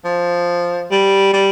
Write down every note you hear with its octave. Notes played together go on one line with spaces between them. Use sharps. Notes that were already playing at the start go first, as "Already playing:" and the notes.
F3
G3
G3